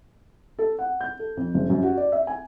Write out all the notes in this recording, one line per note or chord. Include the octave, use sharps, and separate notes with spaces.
A4
F#5
G6
A4
F2
F#1
F#2
F#4
D5
E5
G#5